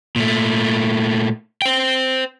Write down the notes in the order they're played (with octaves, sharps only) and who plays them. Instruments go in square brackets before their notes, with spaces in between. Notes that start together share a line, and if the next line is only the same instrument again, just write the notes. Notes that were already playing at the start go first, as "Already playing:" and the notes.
[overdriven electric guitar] A#2 A3
C5 G5